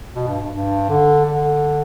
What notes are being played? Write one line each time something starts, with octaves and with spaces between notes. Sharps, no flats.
B2
G2
G2
D3
D3